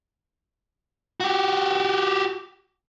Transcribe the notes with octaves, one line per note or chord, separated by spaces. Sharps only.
F#4 G4